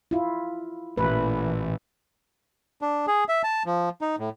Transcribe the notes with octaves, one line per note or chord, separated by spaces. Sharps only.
E4 F4
A1 A#2 E3 B4
D4
G#4
E5
A5
F3
D#4
A2